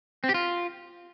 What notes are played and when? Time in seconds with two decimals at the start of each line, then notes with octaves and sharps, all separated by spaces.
0.24 C4
0.29 G4
0.34 F4